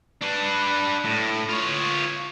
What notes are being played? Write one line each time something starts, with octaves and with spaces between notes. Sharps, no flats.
D4 B4
A2
F4 C#5